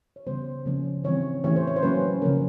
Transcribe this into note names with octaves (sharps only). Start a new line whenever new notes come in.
C#5
C#3 E3 G3 B3 C5
C#3 F3 A#3 C#4
E3 G3 C4 C#5
E3 A3 C#4 C#5
C5
C#5
C5
F#3 A#3 C#4 B4
C#3 F3 A#3 C#4 A#4